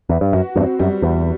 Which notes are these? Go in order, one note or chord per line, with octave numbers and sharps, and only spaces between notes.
E2 B4
G2
F#2 F#4
E2 G2 C4
F#2 G3
E2 B4